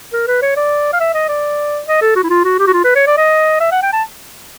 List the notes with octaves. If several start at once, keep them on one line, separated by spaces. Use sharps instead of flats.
A#4
B4
C#5
D5
F5
E5
D#5
D5
D#5
A4
F#4
E4
F4
F#4
G4
F#4
F4
B4
C#5
D5
D#5
E5
F#5
G5
A5